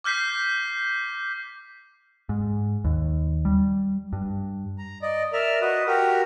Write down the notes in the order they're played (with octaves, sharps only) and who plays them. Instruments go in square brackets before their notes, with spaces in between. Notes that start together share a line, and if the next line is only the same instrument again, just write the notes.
[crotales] D6 F6 G6 B6 C7
[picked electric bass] G#2
D#2
G3
G2
[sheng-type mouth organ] A#5
D5 D#5
A#4 D5 E5 F6
F#4 B4 D#5
F#4 G4 A#4